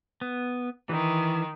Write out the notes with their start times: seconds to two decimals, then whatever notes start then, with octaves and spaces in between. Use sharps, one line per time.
0.21 B3
0.89 D#3 E3